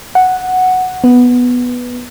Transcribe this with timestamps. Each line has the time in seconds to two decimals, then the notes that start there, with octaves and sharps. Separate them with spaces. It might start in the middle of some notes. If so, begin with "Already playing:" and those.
0.15 F#5
1.04 B3